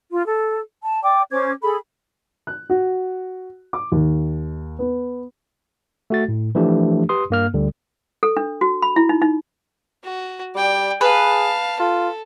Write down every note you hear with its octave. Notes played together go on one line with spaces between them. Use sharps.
F4
A4
A5
D5 G5 D6
C#4 C5 D6 G#6
G#4 A4 B5
F#6
F#4
D6
D#2
B3
A3 F#4 A6
A2
E3 F3 A3 D4 G4
G4 B4 C6 D#6
G2 A#3 F6
D2 D3 G3
A4
D4
F#4
B5
E4
D#4
D#4
F#4
G3 D5 G5
G#4 B4 F5 A5
F4 A4